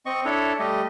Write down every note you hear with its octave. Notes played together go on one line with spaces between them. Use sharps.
C4 D#5 C#6
D4 E4 A4 C#5
G3 A3 G4 D#5